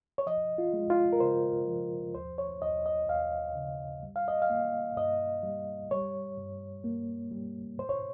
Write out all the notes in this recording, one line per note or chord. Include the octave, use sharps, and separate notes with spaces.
C#5
F3 D#5
F4
G#3
F4
A#4
C#3 C5
F3
D#2 C5
C#5
D#2 D#5
D#5
D#2 F5
C#3
G3
F5
D#5
F5
A#3
G2 D#5
G3
G3 C#5
G2
A#3
G3
G#2 C5
C#5